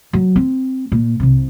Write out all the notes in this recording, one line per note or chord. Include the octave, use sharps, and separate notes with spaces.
F#3
C4
A#2
C2 C3